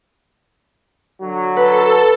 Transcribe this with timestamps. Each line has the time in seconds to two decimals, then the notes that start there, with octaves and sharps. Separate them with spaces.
1.21 D3 F#3
1.57 A4 B4